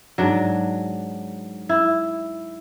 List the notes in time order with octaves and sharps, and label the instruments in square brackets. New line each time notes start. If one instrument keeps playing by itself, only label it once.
[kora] G#2 F#3 D4
E4